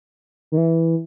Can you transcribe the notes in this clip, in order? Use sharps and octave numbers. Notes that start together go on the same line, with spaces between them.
D#3
E3